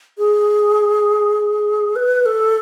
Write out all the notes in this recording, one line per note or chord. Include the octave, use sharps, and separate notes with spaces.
G#4
B4
A4